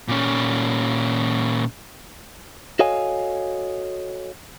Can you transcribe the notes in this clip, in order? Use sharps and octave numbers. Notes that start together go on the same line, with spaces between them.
A#2 C#4
F#4 A4 C#5 D#5 F5 G#5